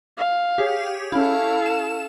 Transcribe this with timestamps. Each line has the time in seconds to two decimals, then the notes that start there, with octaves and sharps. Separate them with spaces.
0.18 F5
0.58 G4 G#4 C#5
1.12 C#4 E4 A4 F5
1.66 E7